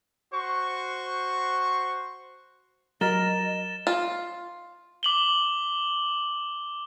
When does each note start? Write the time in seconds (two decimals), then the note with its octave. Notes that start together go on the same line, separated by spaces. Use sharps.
0.34 F#4 C5 C#6
3.01 F#3 A#4 D#5 A6 E7 G7
3.87 F4
5.03 D6 F#7 G7